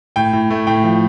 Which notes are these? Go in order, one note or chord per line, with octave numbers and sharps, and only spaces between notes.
A2 G5
A2
A3
A2 G5
F3